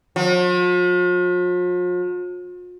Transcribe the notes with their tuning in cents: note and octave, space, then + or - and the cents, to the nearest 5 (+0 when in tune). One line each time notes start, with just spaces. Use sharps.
F3 +45